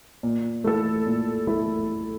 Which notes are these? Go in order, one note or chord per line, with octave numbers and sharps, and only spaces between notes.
A#2
A3 E4 A4
A#2
A3 E4 A4